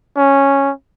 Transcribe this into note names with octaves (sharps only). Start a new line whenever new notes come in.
C#4